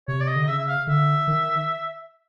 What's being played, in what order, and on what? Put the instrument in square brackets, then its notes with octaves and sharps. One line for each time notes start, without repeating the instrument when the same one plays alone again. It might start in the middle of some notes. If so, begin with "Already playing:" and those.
[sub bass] C3 [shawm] C#5
[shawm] D5
D#5
[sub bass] D3
[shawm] D#5
[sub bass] C#3 [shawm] E5
[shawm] E5
F5
[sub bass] D3 [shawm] E5
[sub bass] D#3